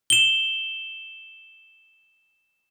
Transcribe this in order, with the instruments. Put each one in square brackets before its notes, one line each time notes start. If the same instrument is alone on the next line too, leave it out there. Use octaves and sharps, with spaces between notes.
[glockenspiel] E7 G7